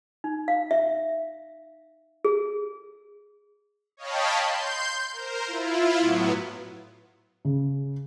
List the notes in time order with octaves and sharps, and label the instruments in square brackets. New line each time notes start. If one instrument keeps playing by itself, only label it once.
[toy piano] D#4
F5
E5
G#4
[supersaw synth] C#5 D#5 F5 G5 A5 B5
C6 G6
A#4 C5
E4 F4
A2 F#3 B3
[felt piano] C#3